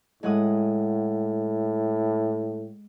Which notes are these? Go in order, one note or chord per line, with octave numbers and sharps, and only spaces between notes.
A2 G#3 F#5 D#6